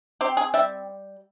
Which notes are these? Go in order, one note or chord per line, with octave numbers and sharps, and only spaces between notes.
C4 G4
G#4
G3 E5